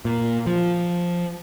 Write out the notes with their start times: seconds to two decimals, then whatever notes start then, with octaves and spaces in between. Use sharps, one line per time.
0.05 A#2
0.47 F3